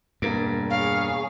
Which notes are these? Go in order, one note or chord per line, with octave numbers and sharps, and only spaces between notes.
E1 G2 A#3 D7
G#4 C#5 F5